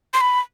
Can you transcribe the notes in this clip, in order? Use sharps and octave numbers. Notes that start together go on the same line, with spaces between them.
C6
B5